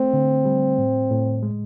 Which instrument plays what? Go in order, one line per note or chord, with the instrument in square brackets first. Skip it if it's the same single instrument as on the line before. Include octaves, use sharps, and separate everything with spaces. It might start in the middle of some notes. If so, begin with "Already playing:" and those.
Already playing: [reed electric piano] A3 [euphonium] C4
[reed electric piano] D3
G3
A2
A2
G#3